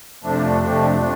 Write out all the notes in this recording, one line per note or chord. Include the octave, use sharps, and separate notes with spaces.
F2 C3 F3 A3 D4
F2 C3 F3 A3 D4
C3 F3 A3 D4